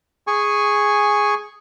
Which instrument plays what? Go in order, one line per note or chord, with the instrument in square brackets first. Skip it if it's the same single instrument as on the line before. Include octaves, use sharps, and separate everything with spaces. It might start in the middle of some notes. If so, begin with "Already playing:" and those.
[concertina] G#4 G#5 C#6